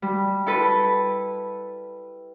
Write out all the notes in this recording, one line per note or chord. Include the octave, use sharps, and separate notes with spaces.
G3
E4 A4 B4